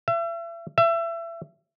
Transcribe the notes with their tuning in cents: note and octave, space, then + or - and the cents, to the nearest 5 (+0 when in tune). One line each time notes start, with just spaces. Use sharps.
E5 +40
E5 +30